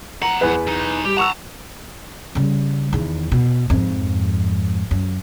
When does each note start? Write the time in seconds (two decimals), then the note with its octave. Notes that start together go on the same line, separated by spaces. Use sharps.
0.22 F2 F#5 A#5
0.41 E2 B4
0.67 B1 D#4
1.05 G3 G4
1.17 F#5 A5 A#5 C#6 E6
2.35 C#3 G3
2.93 E2 D#3
3.32 B2
3.70 F2 G#2
4.91 F#2